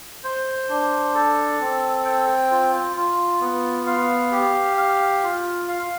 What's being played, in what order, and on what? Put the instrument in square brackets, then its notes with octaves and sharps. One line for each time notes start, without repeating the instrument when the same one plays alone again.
[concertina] C5
D4
A4
C4
G5
F4
F4
B3
F5
G4
F5
F4
F5